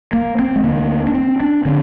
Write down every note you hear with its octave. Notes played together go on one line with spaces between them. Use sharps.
A#3
C4
G#3
D2 D3 A#3
D4
C4
D4
D3 C4